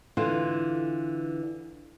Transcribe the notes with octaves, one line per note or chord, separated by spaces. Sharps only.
D3 E3 F4